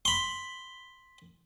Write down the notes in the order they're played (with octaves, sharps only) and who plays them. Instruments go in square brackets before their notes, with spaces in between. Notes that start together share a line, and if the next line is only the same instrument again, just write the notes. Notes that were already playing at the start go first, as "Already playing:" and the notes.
[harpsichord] B5 C6